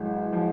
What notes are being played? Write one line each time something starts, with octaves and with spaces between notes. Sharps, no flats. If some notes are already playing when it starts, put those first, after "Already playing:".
Already playing: A1 F#3 G#3
F3